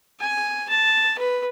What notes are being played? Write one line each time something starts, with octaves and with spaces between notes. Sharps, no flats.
G#5
A5
B4